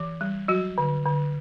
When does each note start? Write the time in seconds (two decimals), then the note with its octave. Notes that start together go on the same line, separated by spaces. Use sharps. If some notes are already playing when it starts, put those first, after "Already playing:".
Already playing: E3
0.21 G3
0.48 F#3 F#4
0.78 D3
1.05 D3